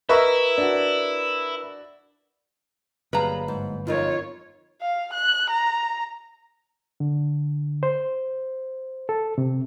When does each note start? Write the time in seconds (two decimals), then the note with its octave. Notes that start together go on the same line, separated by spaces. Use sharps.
0.09 E4 A#4 B4 D#5 E5 C#6
0.58 D4 F#4
3.13 G1 F#3 G3 A#3 G#4 B4 F5 A#5
3.48 G#2
3.87 F2 D#4 F4 A#4 C#5
4.82 F5
5.13 F#6
5.50 A#5
7.00 D3
7.83 C5
9.09 A4
9.38 C3